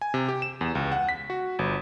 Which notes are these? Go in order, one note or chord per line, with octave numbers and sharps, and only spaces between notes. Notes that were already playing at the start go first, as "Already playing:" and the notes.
G#5
C3
G4
E7
E2
C#2
F#5
B6
F#4
G1